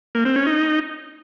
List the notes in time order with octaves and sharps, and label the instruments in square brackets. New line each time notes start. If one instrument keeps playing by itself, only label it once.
[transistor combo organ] A#3
C4
C#4
D#4